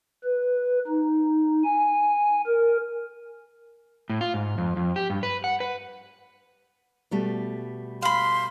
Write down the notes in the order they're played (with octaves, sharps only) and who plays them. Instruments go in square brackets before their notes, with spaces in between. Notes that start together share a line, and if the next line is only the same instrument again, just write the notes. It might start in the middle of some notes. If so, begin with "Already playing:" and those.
[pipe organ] B4
D#4
G#5
A#4
[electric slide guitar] A2
F4
G#2
F2
F2
G4
G2
B4
F#5
B4
[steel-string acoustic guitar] B2 G3 A3
[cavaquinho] F5 B5 [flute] C6